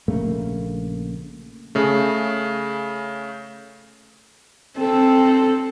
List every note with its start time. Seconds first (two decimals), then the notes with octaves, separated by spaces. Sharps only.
0.08 A#1 C#3 A3 A#3
1.75 C#3 A3
4.78 C4 A4